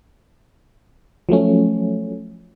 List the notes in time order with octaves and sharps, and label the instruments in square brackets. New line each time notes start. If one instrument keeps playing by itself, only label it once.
[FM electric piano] F3 F#3 A3 C#4